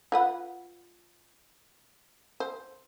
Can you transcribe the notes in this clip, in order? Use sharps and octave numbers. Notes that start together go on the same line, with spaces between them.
F4 B4 F#5
C5